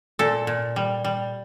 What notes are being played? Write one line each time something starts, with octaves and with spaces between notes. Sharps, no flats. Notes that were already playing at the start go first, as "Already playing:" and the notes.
A#2 A4
A#2
G3
G3